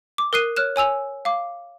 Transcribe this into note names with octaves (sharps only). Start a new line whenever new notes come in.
D6
A#4 D#6 F#6 C7 D#7
C#5 F6 F#6 E7
C#5 G#5 E6 F7
F5 D6